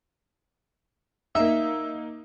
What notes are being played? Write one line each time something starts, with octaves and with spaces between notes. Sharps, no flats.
A#3 D#4 E5